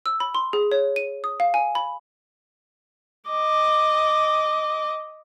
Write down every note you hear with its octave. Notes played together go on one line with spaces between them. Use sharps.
E6
B5
C6
G#4
C#5
D#7
D#6
F5
G#5
B5
D#5 D6